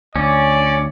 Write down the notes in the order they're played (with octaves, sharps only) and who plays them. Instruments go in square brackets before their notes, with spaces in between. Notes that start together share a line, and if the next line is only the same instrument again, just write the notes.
[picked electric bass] D2 [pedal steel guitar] C#4 [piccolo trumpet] D5